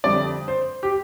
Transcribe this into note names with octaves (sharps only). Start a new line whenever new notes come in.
F2 D3 G3 D5
C5
G4